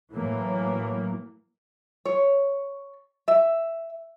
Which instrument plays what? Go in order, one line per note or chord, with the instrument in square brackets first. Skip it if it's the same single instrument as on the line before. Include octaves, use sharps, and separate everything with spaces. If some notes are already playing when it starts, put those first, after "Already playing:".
[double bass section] A2 E3 F#3 A#3
[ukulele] C#5
E5